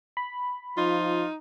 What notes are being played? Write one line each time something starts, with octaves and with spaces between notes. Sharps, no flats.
B5
F3 D#4 F4